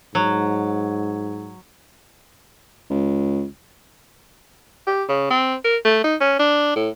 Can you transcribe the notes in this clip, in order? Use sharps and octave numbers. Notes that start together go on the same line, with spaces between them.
G#2 F#3
C#2
G4
C#3
C4
A#4
A3
D#4
C#4
D4
A2